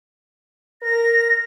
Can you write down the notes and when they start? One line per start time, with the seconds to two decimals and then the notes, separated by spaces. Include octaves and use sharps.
0.82 A#4 A#6